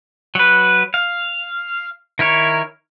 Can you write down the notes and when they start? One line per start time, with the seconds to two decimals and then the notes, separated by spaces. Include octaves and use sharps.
0.35 F#3 B4
0.94 F5
2.19 D#3 E4 A#4 C#5